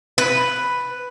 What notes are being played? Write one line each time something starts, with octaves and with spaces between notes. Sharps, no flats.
B4